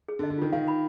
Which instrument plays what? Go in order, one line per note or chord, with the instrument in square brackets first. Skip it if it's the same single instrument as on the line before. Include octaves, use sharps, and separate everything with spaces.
[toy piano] G#4
[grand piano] D3
[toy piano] D#5
[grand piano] D3
[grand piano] D#3 [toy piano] F4
[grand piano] D#3 [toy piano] F5
[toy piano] B5